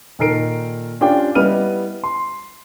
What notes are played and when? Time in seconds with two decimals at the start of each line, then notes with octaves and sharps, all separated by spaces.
0.19 A#2 D#3 A4 A#4 C7 D7
1.01 C#4 D4 F4 G4 G5
1.35 G3 B3 E4 D#5 F6 D#7
2.04 C6